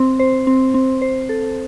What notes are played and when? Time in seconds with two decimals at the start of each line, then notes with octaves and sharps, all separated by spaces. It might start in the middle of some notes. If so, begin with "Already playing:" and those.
Already playing: C4
0.19 C5
0.47 C4
0.74 C4
1.02 C5
1.29 A4